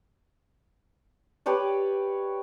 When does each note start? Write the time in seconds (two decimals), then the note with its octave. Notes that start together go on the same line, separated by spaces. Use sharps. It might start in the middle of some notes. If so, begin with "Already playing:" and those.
1.46 G4 B4 C#5 D5